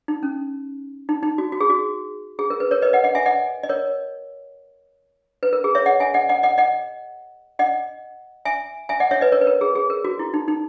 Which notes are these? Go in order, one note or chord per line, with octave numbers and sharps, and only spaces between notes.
D#4
C#4
D#4
D#4
F#4
F#4
G#4
F#4
G#4
A#4
B4
A#4 C#5
B4 D#5
D#5 F#5
D#5 F#5
E5 G#5
D#5 F#5
D#5
A#4 C#5
B4
A#4
G#4
C#5 E5
D#5 F#5
E5 G#5
D#5 F#5
D#5 F#5
D#5 F#5
D#5 F#5
D#5 F#5
E5 G#5
E5 G#5
D#5 F#5
C#5 E5
B4 D#5
A#4 C#5
B4
A#4
G#4
G#4
A#4
F#4
E4
D#4
D#4